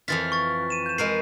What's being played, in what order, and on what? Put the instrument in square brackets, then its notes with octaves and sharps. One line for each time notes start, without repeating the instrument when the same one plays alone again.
[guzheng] F2 E3 F4 [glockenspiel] A6 B6
[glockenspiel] C#6 A6
D#7 E7
G6 E7
[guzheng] G#3 A#4 B4 [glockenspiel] C7